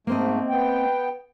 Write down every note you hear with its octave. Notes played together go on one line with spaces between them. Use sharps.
G#2 A3 A#3 C4 D#5
B3 G5